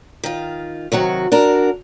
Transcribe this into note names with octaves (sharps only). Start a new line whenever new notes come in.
D#3 F4
C3 D#3 F#3 F#4
D4 F#4 A#4